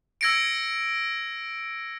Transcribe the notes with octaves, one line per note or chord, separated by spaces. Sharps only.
E6 G#6 A#6 C#7 D7